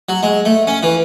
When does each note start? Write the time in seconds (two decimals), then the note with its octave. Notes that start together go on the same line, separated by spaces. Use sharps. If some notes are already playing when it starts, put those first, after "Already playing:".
0.09 F#3
0.23 G#3
0.45 A3
0.67 C#4
0.83 E3